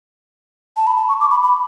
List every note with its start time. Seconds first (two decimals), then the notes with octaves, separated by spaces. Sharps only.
0.77 A5
0.87 B5
0.97 A5
1.09 C#6
1.20 D6
1.31 B5
1.43 B5